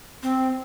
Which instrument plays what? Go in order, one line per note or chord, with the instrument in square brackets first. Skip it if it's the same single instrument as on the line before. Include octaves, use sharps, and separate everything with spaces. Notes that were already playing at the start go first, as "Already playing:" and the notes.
[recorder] C4